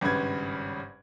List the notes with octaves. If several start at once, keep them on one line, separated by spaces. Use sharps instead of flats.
G#1 G2 C#3 B4 G#6